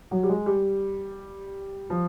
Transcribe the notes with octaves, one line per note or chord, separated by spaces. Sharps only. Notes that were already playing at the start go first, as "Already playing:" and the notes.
F#3
G3
G#3
G3
F3